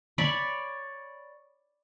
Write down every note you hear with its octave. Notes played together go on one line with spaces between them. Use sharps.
C#5 D5 B5